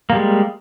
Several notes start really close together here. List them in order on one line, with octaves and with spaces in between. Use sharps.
A#3 G3 G#3